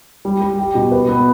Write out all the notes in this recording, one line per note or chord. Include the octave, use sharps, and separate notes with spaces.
G3
G3
G4
B2
B4
B3